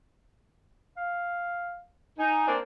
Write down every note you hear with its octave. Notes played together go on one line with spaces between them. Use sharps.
F5
D#4 G#5
A#3 C4 D4